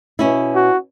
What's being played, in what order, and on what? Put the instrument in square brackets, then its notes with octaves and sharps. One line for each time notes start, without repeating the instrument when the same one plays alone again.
[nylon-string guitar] B2 C#4 E4
[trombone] F#4